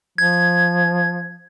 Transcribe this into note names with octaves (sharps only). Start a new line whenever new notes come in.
F3 G#6